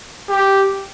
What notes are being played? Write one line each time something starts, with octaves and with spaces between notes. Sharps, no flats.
G4